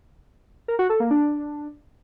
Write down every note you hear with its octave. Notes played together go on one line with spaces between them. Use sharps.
A#4
F#4
A4
A#3
D4